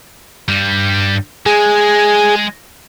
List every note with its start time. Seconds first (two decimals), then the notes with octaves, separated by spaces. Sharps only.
0.48 G2 G3
1.46 G#3 G#4